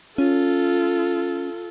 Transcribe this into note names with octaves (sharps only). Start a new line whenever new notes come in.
C#4 F4 A4